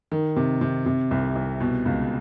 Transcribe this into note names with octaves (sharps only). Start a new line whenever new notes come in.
D#3
C3
C3
C3
C2
C2
B2
C#2